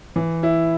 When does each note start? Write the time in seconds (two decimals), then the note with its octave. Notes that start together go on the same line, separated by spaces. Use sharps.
0.16 E3
0.43 E4